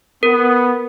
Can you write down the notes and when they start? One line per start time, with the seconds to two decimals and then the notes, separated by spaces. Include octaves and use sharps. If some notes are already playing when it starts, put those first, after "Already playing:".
0.23 B3 A#4